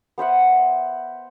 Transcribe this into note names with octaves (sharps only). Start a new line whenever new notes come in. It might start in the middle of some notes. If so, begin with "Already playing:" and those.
B3 C5 E5 F#5